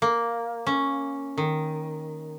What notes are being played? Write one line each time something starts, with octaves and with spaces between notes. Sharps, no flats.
A#3
C#4
D#3